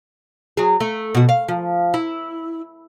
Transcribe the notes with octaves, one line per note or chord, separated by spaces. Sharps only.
F#3 G#4
A3
B2 F#4
F5
F3
E4